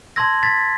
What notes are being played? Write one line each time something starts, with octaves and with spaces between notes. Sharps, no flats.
A5 C6 E6 G#6 A#6
A6 B6